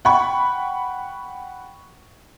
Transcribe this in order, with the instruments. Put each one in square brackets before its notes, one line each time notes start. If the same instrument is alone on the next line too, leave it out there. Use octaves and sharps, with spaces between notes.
[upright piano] F#5 G5 B5 C#6